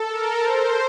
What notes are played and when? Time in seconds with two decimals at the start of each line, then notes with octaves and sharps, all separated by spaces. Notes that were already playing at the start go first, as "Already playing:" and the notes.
Already playing: A4
0.09 A#4
0.43 C5